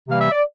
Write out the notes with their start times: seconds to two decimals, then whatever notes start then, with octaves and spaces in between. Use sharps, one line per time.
0.08 C3 E3 G3 A#3 F5
0.19 E5
0.31 D5